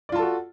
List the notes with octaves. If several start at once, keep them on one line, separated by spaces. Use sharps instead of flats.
F4 F#4 A4 D5 A5